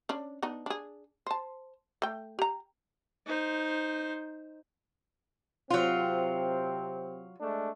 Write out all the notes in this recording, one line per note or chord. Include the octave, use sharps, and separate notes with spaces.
C#4 D4
B3 D4 D#4
D4 G#4
C5 A5
A3 G5
G4 A#5
D#4 C5
C3 F#3 C4 F4
G#3 A3 D4